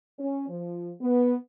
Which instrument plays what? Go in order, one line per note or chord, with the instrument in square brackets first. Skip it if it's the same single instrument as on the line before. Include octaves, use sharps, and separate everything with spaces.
[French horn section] C#4
F3
B3